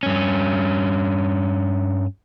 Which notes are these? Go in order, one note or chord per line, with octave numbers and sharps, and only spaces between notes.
G2 C#4